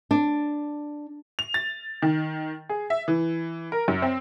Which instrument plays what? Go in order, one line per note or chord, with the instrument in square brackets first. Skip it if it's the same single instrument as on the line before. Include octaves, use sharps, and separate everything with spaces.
[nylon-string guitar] D4
[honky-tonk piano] F7
A6
D#3
G#4
E5
E3
A#4
F#2
C4